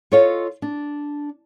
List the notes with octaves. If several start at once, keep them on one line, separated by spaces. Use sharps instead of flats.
F4 A4 C#5 D#5 F5
D4